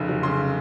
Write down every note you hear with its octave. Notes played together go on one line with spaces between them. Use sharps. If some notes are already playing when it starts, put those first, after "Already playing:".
Already playing: F1 C#3
F#3
C#3 C6